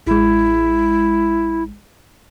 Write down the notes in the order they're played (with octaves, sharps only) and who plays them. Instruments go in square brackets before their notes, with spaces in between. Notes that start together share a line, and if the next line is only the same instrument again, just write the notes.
[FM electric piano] A1 G#3 [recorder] E4